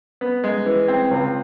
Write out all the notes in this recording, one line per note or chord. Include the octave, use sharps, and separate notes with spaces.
B3
G#3
E3
C4
C#2